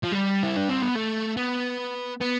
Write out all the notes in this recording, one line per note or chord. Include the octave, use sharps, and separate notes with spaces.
F3
G3
E4
D4
C4
B3
A3
B3
B3